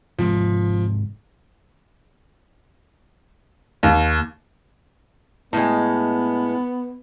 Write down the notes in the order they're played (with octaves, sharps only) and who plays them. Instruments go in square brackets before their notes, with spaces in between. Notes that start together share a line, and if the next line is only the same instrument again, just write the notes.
[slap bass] G#2 C3 D#3 [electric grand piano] F3
[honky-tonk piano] D#2
[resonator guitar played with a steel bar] A2 G#3 [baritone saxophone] B3